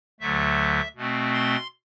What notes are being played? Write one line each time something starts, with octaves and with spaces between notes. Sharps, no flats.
D2 D3 F#3 A3 E5
B2 A3 C4
C6